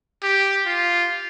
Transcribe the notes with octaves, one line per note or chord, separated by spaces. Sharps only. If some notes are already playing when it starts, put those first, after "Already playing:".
G4
F4